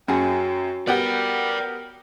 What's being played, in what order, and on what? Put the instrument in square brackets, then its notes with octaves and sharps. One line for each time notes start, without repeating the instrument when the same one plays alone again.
[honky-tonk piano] F#2 [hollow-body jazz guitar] C#4 F#4 G#4 [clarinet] G5
[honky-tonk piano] B3 G4 F#5 [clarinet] A#4 [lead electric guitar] D5 G5